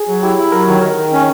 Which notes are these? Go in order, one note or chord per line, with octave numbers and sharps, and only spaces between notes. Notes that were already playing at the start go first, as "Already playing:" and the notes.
Already playing: G#4
F#3
E4 G4
E4
F#3 A#4
D#3
D#3 A#4
D#3
C#4